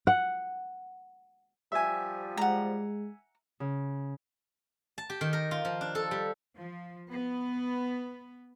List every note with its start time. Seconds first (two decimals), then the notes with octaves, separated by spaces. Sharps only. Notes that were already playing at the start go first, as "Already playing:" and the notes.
0.07 F#5
1.72 F3 G3 E5 G#5
2.37 G#3 F#5 A#5
3.60 C#3
4.98 A5
5.10 G4
5.21 D#3
5.33 A#4
5.51 F4
5.65 F3
5.81 D4
5.95 A4
6.11 G3
6.55 F3
7.09 B3